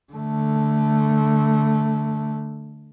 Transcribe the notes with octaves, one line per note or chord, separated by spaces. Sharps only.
D3 A3